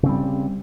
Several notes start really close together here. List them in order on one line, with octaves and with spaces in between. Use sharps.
C#3 C4 G3